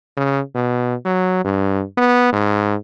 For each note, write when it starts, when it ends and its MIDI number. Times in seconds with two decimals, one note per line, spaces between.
0.17 0.40 49
0.55 0.95 47
1.05 1.41 54
1.44 1.83 43
1.97 2.31 59
2.33 2.75 44